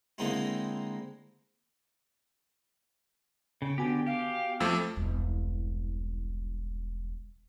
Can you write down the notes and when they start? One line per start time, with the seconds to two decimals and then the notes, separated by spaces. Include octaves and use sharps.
0.18 D3 G#3 A#3 C4 D#4 E4
3.62 C#3 G5
3.78 D3 B3 F#4 G4 G#5
4.06 G4 F5
4.60 F2 F3 A3 D6 E6
4.97 E1 C2